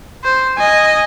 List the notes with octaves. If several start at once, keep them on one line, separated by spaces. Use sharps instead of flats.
C5
D#5 G#5